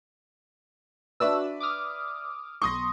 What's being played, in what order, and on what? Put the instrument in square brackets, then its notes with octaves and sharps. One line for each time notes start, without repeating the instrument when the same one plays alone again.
[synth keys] D4 F#4 E6 [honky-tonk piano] B4 D5 E5
[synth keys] D6 D#6 F6
[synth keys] B1 C6 [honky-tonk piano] C#6 D#6 A#6